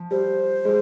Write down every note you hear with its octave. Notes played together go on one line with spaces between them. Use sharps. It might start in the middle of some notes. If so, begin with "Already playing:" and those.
Already playing: F3
G3 C5
G#3